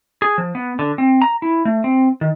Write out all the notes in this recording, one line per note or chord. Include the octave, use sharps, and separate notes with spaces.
G#4
F3
B3
D3
C4
A#5
E4
A3
C4
D#3